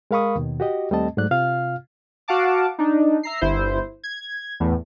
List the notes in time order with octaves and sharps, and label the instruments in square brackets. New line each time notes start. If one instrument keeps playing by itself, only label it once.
[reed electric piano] G#3 A#4 F5 B5 C#6 D#6
D#2 B2 D#3
F#4 G4 D#5
D#2 G3 A3 C4 D#5 A5
G#2 F#3 A3 D5 F#6
C3 F4 F5 F6
[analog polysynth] F#4 F5 F#5 A5 D6
D4 D#4
E5 A#5 C7
G1 E4 C5
G#6
E2 A2